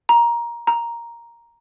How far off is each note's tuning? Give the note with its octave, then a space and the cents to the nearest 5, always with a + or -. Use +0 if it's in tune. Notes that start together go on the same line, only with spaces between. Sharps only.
A#5 +15
A#5 +5